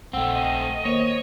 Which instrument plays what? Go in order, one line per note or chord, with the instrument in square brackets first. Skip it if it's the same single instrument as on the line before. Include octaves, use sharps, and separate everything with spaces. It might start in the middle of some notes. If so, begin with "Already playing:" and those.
[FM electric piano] A#1 [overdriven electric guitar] A3 C4 [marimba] F#5 G5 [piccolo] E6
[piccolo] D#5
[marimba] D#3 C5 [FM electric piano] A#3 [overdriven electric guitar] C#5